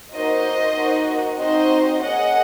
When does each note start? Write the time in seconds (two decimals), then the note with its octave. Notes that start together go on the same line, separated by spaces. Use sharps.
0.13 A#3 D#4 F#4 C5 D#5
0.77 A#3 D#4 F#4
1.39 C4 D#4 F#4 C5 D#5
2.02 A#3 C#4 G#4 D#5 F#5